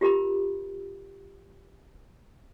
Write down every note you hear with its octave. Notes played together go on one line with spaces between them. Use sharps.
F4 G4 A#4 A#5 B5